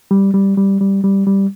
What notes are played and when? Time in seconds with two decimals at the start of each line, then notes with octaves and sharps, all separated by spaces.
0.11 G3
0.34 G3
0.57 G3
0.81 G3
1.04 G3
1.27 G3